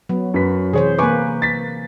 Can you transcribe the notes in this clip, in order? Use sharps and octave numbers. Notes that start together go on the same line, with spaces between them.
F#3 B3
F#2 B4 B6
C3 E3 G#4 C5 C#5
A#3 B4 G#5 C#6 D6
A6 B6